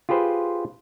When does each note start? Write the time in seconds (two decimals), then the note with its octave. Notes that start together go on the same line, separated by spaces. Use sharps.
0.09 F4 G4 G#4 B4 C5